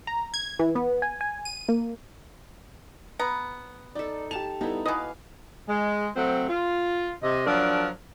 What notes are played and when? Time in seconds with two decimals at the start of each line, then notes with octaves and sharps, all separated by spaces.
0.07 A#5
0.34 G#6
0.59 E3
0.75 B3
1.02 G#5
1.21 G#5
1.45 D#7
1.69 A#3
3.19 B3 A#5
3.95 D#4 A4 D5
4.31 G4 A5 E7 F7
4.61 G3 B3 D#4 E4 A4
4.86 B2 B4 D#5 F5 G#5 D6 F#6
5.68 G#3
6.16 F#3 A3 C4
6.49 F4
7.23 C3 D#5
7.46 F3 F#3 D4 A#4